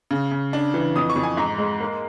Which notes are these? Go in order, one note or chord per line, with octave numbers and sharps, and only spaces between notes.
C#3
C#3
D4
E3
F2 D#6
C#6
F2
G#5
G#2 A#5
G#3
A#3